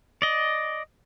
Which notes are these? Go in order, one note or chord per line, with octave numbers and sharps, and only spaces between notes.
D5 D#5